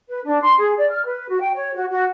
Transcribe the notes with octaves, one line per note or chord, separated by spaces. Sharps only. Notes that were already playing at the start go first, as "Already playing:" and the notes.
B4
D4
C6
G#4
D5
F6
B4
F#4
G5
C#5
F#4
F#4